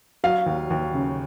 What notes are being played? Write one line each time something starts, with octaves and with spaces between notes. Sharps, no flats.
F#3 F5
D#2
D#2
C#3